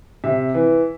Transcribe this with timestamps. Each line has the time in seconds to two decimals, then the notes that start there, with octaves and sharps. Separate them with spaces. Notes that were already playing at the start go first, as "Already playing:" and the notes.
0.24 C3 E5
0.54 E3